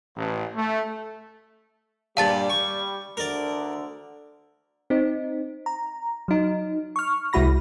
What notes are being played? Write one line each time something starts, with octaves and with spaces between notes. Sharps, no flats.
A1
A3
G2 A#2 G3 F5 A5 A6
C#6
D2 D3 A#4 D5
C4 D#4
A#5
F#3 D#4
C#6 F6
C2 G#3 E4 F#4 B5 A#6